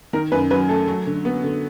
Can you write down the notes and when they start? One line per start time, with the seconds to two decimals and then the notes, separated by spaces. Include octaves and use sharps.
0.13 D#3 A#4
0.32 F#2 B4
0.51 F#3 B4
0.69 A3 A4
0.88 F#3
1.07 D3
1.25 B3
1.44 D3